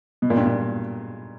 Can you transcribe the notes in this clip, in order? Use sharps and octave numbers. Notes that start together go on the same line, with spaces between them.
B2
A#2
G2
A#2